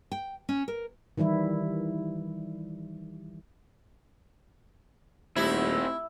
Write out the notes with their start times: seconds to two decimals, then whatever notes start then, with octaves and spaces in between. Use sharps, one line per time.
0.12 G5
0.49 C#4
0.68 A#4
1.17 D#3 E3 G3 E4
5.36 D#1 A3 C4 D#4 E4 G4 F#6